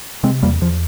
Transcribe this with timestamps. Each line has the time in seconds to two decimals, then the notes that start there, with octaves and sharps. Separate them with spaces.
0.23 C3 G#3 C4
0.43 E2 G3 A#3
0.61 E2 F3